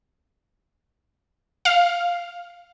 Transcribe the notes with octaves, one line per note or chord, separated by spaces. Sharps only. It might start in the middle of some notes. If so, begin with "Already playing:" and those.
F5